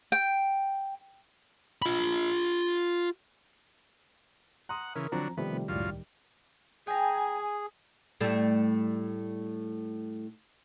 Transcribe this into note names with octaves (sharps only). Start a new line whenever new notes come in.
G5
F4 B5
F#5 A#5 C6 D#6
C#3 E3 A#4
D3 F3 F#3 C4 A#5
C3 D#3 F3 G3 A3 B3
C#2 F#2 A2 F4 D5
G#4 G5 G#5 A#5
A2 G3 A3